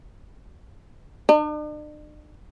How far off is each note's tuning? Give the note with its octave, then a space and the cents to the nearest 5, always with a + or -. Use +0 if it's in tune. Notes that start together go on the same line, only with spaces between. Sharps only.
D4 +45